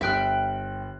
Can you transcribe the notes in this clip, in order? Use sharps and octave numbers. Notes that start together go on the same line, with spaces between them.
G1 E5 G5 F6 F#6